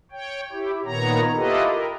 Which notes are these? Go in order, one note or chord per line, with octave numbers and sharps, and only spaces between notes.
C#5 G5
E4 G4
A#2 D#3 B3 C#5 A#5
E4 F4 G4 A4 B4 D#5
A#4